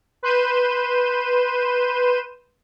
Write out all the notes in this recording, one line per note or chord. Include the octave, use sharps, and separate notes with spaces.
B4 C6 G6 D#7 E7